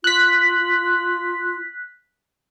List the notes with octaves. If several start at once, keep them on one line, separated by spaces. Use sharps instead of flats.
F4 F#6 B6